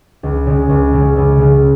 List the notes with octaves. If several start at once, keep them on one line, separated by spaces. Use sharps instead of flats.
C#2
C#3 G#3
C#2
C#3 G#3
C#2
C#3 G#3